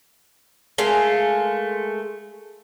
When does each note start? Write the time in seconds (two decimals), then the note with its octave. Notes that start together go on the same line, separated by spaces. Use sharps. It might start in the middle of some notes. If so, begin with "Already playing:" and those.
0.78 G#3 A3 A#4 F5